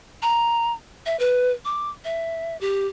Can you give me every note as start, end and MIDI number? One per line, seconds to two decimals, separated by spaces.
0.22 0.73 82
1.06 1.18 76
1.19 1.51 71
1.65 1.89 86
2.04 2.57 76
2.61 2.87 67